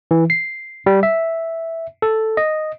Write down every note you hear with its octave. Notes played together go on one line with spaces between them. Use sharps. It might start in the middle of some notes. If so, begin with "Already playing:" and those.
E3
C7
G3
E5
A4
D#5